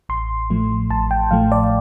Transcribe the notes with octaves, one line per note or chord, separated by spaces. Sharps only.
A1 C6
A2 F3 A3
A1 A5
G5
A2 F3 A3 F5
D5